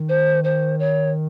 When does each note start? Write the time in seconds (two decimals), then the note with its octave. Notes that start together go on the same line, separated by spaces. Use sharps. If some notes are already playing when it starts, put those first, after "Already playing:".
Already playing: D#3
0.09 C5
0.44 C5
0.79 C#5